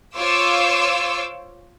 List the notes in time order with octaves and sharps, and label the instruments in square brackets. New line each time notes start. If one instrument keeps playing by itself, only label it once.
[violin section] F4 C5 C#5 D6 E6